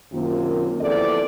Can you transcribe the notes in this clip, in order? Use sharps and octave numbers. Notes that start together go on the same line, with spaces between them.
F#2 C3 D#3 A#3 F4
E2 F3 C4 A4 D5